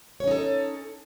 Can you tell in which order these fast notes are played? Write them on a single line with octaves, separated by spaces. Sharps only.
C#5 C#4 D#4 A4